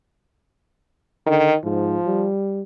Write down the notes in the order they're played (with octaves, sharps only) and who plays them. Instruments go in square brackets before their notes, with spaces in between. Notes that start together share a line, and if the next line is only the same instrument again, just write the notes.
[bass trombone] D3 [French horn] D#3
[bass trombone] G#2 [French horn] F3
[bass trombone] G3